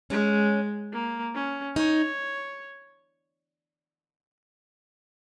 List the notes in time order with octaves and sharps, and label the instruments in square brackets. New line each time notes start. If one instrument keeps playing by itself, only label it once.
[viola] G#3 [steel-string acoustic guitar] C#4
[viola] A#3
C#4
[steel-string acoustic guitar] D#4 [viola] C#5